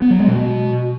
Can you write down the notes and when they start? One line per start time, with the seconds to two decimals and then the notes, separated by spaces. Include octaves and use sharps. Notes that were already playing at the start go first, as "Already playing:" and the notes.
0.02 B3
0.10 F#3
0.19 G#3
0.28 B2